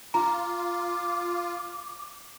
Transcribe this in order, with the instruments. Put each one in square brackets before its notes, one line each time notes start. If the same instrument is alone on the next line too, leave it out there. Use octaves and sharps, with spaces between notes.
[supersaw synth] F4 [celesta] A#5 [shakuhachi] D6